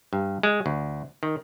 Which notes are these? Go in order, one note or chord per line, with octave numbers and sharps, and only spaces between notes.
G2
G#3
D2
D#3